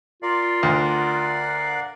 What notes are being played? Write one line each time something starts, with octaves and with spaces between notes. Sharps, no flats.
F4 A#4 D5 F5
D2 F#5